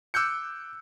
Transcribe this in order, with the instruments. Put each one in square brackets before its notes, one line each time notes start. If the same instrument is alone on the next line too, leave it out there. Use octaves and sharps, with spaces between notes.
[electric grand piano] D6 E6 F#6 G6 C#7